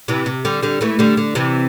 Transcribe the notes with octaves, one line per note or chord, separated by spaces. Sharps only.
C3 E3
C3
D3 G3
D3 G3
E3 A3
D3 G3
D3
C3 E3